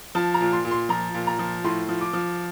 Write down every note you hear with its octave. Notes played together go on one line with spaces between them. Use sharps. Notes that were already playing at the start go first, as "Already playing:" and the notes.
F3 A5
A#5
A#2
C6
A#2
C6
F3 A#5
A#2
A#5
F3
A2 C6
F3
D6
F3